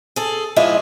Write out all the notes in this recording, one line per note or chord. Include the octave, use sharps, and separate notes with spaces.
G#4 A4
F3 G#3 E4 F4 D5